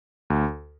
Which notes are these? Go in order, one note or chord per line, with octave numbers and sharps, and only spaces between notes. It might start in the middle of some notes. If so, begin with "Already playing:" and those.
D2